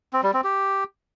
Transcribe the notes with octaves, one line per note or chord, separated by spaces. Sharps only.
C4
G3
C4
G4